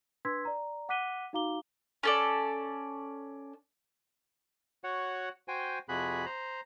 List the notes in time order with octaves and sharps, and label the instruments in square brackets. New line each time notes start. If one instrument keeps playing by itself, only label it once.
[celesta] D4 B4 C6 E6 G#6 B6
D5 A#5
F#5 D6 F#6 B6 D#7 G7
D#4 F#4 F5 A#5 D6 G7
[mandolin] C#4 A4 D5
[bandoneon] F#4 C#5 F#5
F#4 C5 G5 G#5
F2 C3 F#4 G#4 B5 F#6
C5 A#5